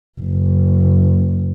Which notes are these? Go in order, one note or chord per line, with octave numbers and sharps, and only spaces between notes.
F#1